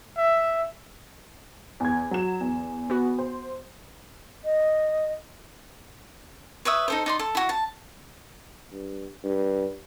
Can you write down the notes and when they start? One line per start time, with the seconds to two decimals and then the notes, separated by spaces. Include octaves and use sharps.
0.17 E5
1.80 E2 G#6
2.11 F#3 E7
2.40 E2
2.90 B3 F#4
3.19 C5
4.45 D#5
6.65 B4 C#5 E5 D#6
6.88 D#4 A4 C5
7.06 D#4 D5 C6
7.19 A4
7.35 E4 F#4
7.49 A5
8.72 G2
9.24 G2